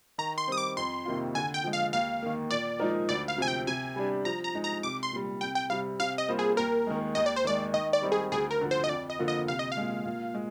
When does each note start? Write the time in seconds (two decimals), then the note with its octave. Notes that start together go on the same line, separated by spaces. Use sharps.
0.18 D#3 A#5
0.38 C6
0.48 G3 C4 D#6
0.58 D6
0.77 F2 C6
1.05 C3 D#3 A#3 F4
1.35 D3 G#5
1.54 G5
1.64 F3 G#3
1.73 F5
1.93 D#2 F5
2.22 D#3 A#3
2.51 A#2 D5
2.80 F3 G#3 D#4 A#4
3.09 D2 D5
3.28 F5
3.38 C3 F3 C4 G#5
3.48 G5
3.67 C3 G#5
3.96 G3 D4 G4
4.25 F3 A#5
4.44 A#5
4.55 G#3 D#4
4.64 A#5
4.83 C2 D6
5.03 C6
5.12 A#2 G3
5.41 C2 G5
5.55 G5
5.70 C3 G3 F5
6.00 C3 F5
6.18 D#5
6.29 G3 A#3 F4 C5
6.39 G#4
6.57 D#2 A#4
6.87 D#3 G#3
7.15 D#2 D#5
7.26 D5
7.36 C5
7.44 D#3 G#3 D5
7.74 D#3 D#5
7.93 D5
8.02 G3 C4 D#4
8.12 G#4
8.32 D2 G#4
8.51 A#4
8.61 D3 F3
8.71 C5
8.84 D#5
8.89 F2 D5
9.10 D#5
9.19 D3 F3 A#3 F4
9.28 D#5
9.48 C2 F5
9.59 D#5
9.72 F5
9.77 A#2 G#3
10.06 A#2
10.34 G#3